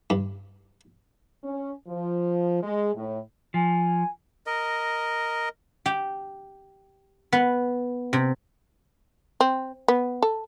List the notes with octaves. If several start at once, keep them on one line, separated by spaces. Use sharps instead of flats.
G2
C#4
F3
G#3
A2
F3 G#5
A#4 D#5
G4
B3
C3
C4
B3
A4